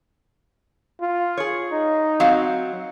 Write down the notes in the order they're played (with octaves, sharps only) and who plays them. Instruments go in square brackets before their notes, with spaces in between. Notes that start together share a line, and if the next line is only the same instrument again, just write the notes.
[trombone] F4
[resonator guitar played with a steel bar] G#4 C#5
[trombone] D#4
[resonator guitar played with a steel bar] F#3 C4 F5